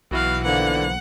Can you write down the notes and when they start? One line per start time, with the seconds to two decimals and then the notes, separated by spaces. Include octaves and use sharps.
0.11 B1 E3 B3 F#4 F5
0.44 D3 E3 F3 A#3 F#5